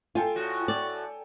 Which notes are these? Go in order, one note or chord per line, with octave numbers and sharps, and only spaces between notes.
F4 A4 G5 G#5
A2 F#4
D5